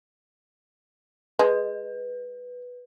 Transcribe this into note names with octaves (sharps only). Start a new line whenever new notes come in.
G#3 B4